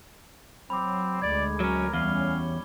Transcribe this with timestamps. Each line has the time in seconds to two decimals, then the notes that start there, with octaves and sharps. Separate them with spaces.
0.70 F#3 C4 B5 D6
1.22 D2 G#3 D5 G#6
1.60 F#3 C#4 A#4
1.93 E2 G3 C#4 F5 G7